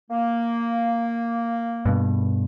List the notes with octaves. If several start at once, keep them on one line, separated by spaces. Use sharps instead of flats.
A#3
G2 B2